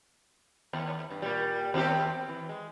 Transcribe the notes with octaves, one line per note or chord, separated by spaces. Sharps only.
D#2
G2
A#2 G3
D#2 C4 G4
E3
G#3